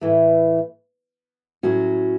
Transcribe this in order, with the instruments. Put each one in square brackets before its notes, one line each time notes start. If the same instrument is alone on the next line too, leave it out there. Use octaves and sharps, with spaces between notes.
[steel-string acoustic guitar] A2 E3 A3
A2 F#3 C#4 F#4